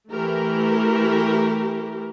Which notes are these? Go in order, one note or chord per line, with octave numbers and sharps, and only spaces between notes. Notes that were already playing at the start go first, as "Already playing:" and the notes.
E3 A3 G4 A#4